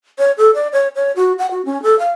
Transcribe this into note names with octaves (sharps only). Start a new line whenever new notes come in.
C#5
A4
D5
C#5
C#5
F#4
F#5
F#4
C#4
A4
F5